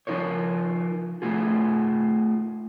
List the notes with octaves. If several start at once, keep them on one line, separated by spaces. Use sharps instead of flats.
F3 D#4 F4 A#4 C#5
A3 D#4 F4 G#4